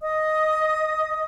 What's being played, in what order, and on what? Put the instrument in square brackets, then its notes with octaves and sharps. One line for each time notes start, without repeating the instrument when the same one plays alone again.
[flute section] D#5 D#6